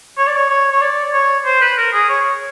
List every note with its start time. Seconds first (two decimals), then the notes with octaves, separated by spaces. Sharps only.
0.18 C#5
0.27 D5
0.36 C#5
0.50 C#5
0.72 C#5
0.81 D5
1.13 C#5
1.45 C5
1.61 B4
1.77 A#4
1.93 G#4
2.09 C#5